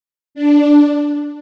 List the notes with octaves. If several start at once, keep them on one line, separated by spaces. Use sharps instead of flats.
D4